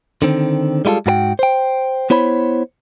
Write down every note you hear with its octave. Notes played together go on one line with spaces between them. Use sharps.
D3 D#3 C4
G3 G#3 E4 F4 A4
G#2 F#4 A#4 G5
C5 G5
B3 E4 C5 C#5 B5